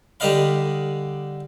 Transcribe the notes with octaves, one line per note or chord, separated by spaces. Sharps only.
D3 G3 D#4 D#5 F5 B5